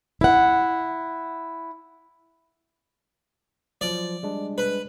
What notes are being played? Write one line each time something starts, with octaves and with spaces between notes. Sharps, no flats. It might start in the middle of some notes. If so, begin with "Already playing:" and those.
E4 F#5
F3 F#3 D5
G3 G#3 D4
B4